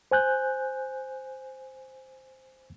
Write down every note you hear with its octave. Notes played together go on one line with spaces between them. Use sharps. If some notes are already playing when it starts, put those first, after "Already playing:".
C5 G#5 F#6 G6